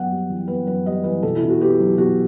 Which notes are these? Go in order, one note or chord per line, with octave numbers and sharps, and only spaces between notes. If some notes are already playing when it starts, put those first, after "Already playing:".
Already playing: F#2 B3 F#5 G5
G3
E3
B3 B4
F#2 B4
G3 D#5
E3 B4
B2 A4
E4
B2
F#4
B3 G4
F#3
B2 F#4